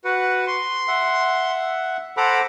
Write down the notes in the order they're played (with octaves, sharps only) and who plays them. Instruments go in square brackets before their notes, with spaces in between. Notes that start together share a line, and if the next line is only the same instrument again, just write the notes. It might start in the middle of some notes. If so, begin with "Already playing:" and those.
[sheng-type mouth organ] F#4 B4 F#5
C6
[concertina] E5 F#5
[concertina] A4 F#5 B5 [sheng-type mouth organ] C5 A#5 D6